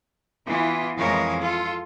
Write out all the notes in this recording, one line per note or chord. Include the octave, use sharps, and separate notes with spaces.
E3 B3 E4 F4
F2 E3 G#3 A#4 C#5 F5
F4 A4